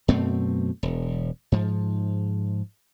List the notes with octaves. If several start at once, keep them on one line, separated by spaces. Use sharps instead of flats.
F#2 B2 A3 C4
E1
G#2 F3